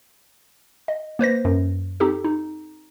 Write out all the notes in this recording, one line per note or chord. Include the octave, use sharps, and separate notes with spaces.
D#5
A#3 B4 C5 A#6
F#2
C4 D#4 G4 A4
D#4